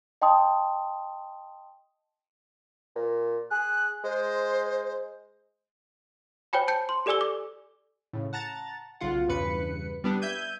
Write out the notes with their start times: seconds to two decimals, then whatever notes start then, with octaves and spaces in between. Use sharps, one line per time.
0.22 D#5 G5 A5 C6 D#6
2.95 A#2
3.51 G#4 F#6
4.04 G#3 C5
6.53 C5 C#5 G5 G#5 B5
6.68 A5 G6 C#7
6.89 C6
7.06 G4 A4 D5 G#5 E6 G7
7.21 D6
8.13 A2 C#3
8.33 F#5 A5 A#5 A6
9.00 B1 C#3 F4 F#5
9.28 E2 G2 C#3 B4 C#7
10.04 G3 B3 D4
10.22 E5 G6 G#6 D#7